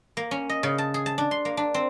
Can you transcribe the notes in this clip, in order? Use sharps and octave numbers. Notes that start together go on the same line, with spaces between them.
A#3
C#4
D#5
C#3
A5
G#4
A5
D4
C6
A#3
D4
C4